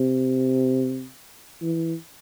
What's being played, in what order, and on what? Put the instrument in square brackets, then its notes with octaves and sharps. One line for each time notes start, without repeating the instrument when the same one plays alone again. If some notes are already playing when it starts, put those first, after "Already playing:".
Already playing: [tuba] C3
E3